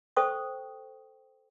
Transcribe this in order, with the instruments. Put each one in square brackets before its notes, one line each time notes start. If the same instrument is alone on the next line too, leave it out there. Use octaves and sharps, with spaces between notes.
[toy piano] A4 C5 G5 C#6 D#6